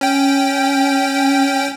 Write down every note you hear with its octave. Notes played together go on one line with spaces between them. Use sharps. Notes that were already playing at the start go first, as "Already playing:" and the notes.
C#4 G5